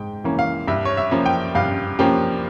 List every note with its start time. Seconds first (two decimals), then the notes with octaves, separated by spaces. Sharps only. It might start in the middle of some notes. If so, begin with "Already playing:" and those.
Already playing: G#2 G5
0.24 E3 A#3 C#4
0.39 F5
0.68 G2 E5
0.85 C#5
0.97 E5
1.11 F3 A#3 C#4
1.26 G5
1.55 G2 F5
1.99 F3 A#3 C#4 G4